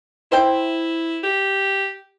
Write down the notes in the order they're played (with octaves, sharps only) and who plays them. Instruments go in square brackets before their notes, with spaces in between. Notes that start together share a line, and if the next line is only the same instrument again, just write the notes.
[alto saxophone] E4 [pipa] C5 E5 G5
[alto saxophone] G4